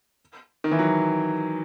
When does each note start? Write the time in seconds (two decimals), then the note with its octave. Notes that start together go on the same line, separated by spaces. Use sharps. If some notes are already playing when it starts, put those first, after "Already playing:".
0.64 D#3
0.71 E3
0.79 F#3